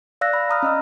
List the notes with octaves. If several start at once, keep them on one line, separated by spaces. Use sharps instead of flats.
D5 F5 E6 F#6 A#6
B5
A#5 D#6 F6
C#4 D#5 E6